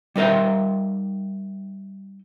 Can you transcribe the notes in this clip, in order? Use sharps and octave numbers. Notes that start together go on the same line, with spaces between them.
G3 D#4 A#4 E5 G5